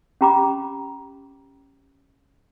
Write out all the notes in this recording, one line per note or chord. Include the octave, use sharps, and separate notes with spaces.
C#4 G4 A#5 B5 D6